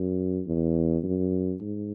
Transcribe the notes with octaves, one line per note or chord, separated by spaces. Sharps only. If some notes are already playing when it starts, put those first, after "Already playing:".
Already playing: F#2
E2
F#2
G#2